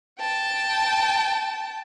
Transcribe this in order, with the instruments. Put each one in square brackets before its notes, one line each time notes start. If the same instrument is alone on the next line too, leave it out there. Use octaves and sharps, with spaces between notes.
[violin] G5 A5